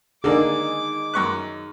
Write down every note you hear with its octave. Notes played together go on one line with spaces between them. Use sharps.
D3 A#3 D#4 G#4 D5 D6
F#2 C#6 F#6